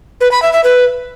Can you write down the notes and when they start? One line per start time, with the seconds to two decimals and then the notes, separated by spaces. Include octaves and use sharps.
0.21 B4
0.32 B5
0.42 E5
0.53 E5
0.64 B4